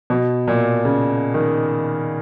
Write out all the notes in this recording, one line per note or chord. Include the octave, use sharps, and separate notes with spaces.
B2
A#2
C#3
D#3